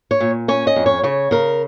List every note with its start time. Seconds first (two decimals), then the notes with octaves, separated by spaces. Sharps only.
0.11 C#5
0.20 A#2
0.48 C#4 C#5
0.67 D#5
0.76 F2
0.86 C#5
1.03 C#3 C#5
1.31 C#3 A#4